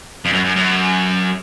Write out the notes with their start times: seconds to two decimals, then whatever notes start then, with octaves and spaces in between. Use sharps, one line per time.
0.25 F2
0.33 F#2
0.45 F#2
0.56 F#2